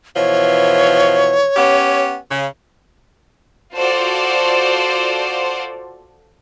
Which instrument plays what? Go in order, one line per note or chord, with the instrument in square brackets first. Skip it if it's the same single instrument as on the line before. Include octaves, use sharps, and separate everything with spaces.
[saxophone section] B2 E3 F3 [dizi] C#5
[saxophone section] B3 C#4 G4
C#3
[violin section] F4 F#4 A4 C5 D5 F5